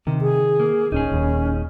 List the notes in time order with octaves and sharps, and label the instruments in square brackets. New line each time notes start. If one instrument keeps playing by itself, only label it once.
[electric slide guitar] C3 [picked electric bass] D#3
[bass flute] G#4
[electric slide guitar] A#3
[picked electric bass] D1 [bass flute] C#4 [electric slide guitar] D#4 G#4
[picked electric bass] D#1 D#2